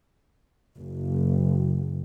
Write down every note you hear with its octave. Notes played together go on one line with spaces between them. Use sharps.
F#1